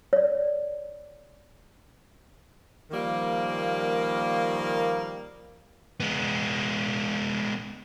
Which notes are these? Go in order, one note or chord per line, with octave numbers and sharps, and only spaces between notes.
C#5 D5
D#3 F3 G3 A#3
G#3 B3